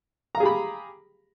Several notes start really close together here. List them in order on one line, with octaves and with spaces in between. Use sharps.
A#5 F5 G#4 G4 B5